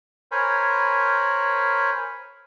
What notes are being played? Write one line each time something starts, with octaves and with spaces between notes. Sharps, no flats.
A#4 C5 C#5 G#5 B5